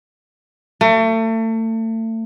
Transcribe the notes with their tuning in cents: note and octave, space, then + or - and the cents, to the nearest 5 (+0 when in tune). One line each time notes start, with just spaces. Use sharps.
A3 +35